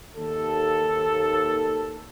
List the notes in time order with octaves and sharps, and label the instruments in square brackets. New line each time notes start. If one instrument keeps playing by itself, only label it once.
[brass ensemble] D#2 A4